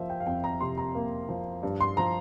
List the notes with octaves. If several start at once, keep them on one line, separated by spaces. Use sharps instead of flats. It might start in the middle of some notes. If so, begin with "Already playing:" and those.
Already playing: F3 A#3 E5
G5
F5
F2 G5
A#5
C3 C6
A#5
A#3
F3
G2
C6
F3 A#5